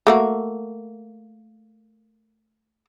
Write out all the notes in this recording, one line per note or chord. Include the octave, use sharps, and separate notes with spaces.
A3 A#3 F#4